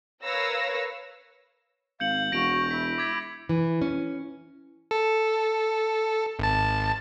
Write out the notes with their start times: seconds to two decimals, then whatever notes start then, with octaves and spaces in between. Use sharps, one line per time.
0.23 A#4 B4 C#5 F5 E6 A#6
2.00 G#1 F5 G6 C#7 F#7
2.32 E1 F#4 A#6 D7 F7
2.71 E4 B6
2.98 D6 G#6 B6
3.49 E3
3.82 C#4
4.91 A4
6.39 G#1 A5